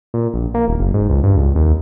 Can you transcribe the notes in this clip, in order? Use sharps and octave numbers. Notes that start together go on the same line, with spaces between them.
A#2
A#1
A#3
D#1
F#1
G#2
C#2
G2
C#2
D#2